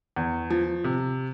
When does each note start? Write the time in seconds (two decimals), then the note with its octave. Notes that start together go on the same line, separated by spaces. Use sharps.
0.16 E2
0.50 F3
0.84 C3